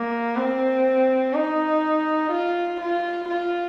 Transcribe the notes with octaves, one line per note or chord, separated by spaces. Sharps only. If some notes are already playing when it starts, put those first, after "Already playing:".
Already playing: A#3
C4
D#4
F4
F4
F4